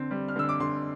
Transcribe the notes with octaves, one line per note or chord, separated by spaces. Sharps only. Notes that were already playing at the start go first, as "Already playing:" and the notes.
Already playing: D3 C4
G3
F6
D3 E6
D6
D3 C6